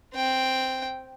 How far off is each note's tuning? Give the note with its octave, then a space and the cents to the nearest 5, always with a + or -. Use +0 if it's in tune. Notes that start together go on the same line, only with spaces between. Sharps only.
C4 +0 G5 +0